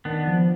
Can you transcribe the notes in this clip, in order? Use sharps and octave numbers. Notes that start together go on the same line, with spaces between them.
D#3 B3 D4
F3